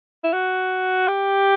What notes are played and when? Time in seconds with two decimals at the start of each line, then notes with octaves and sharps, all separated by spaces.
0.24 E4
0.33 F#4
1.08 G4